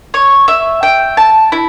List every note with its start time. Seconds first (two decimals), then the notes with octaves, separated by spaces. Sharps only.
0.14 C#5
0.48 E5
0.83 G5
1.17 A5
1.52 E4